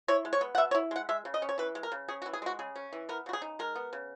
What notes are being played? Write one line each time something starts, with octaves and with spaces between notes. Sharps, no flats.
E4 C#5
G#3
C#5
B3
F#5
B2 E5
C#5
E4
G#3 F#5
G#3 E5
C#3
D#5
C#4
C#5
E3 B4
G#3
A#4
C#3
C#4 G#4
F#4
E3
G#4
G#3 F#4
C#3 G#4
C#4
E3
B3 A#4
C#3 F#4
G#4
D#4
G#3 A#4
B3
C#3